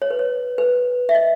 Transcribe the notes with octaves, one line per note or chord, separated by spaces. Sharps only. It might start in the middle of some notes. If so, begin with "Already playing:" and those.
C#5
B4
C#5
B4
E5
D#5